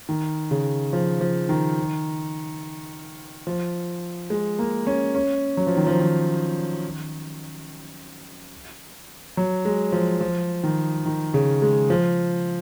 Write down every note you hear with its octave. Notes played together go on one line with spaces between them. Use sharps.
D#3
C#3
F3
F3
D#3
F3
G#3
A#3
C#4
C#4
F#3
F3
D#3
F3
D#3
F#3
G#3
F3
F3
D#3
D#3
C#3
G#3
F3